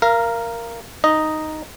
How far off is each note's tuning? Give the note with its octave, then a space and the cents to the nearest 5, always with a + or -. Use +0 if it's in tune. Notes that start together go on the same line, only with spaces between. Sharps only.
A#4 +0 F5 -25
D#4 +0 D#5 +0